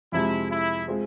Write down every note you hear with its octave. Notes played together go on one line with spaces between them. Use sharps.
F2 C3 F3 G#3 E4
E4
G#3 C4 F4 G#4